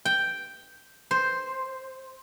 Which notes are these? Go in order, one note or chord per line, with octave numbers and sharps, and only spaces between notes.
G5
C5